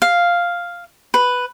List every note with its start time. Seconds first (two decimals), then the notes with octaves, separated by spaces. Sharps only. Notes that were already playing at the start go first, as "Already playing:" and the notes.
0.02 F5
1.14 B4